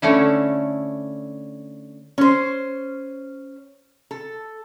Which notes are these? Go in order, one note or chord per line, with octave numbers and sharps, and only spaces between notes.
D3 A3 C#4 E4
C#4 C5
A4